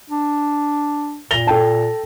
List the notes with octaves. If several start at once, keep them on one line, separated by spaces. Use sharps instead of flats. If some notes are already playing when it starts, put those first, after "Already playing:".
D4
A#2 A#6 F7 G7
A4 G5 A5